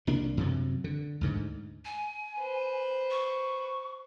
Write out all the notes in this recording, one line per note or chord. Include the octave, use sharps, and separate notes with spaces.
C2 A#3 D4
F#2 C3 F#3
D3
D2 G#2 D3
G#5
B4 C5
C#6